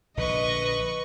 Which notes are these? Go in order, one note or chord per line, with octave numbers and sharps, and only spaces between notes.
A#1 D3 B4 D#5 C#6